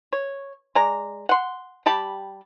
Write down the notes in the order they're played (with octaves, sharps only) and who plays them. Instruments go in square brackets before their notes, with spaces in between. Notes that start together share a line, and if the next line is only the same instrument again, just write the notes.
[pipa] C#5
G#3 D5 A#5
F#5 C6
G3 G4 A5 B5